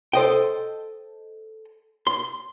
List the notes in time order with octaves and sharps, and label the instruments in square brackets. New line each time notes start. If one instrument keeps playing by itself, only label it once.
[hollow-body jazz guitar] A4 C5 D#5 G5
C6